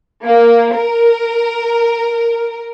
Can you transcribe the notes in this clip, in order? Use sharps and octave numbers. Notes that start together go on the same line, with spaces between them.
A#3
A#4